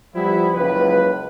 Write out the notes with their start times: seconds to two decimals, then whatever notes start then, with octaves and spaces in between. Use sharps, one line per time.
0.15 F3 G3 B3 E4
0.53 F#1 C#2 B4